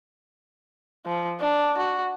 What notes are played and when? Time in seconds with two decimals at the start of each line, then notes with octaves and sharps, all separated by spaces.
1.06 F3
1.40 D4
1.77 F#4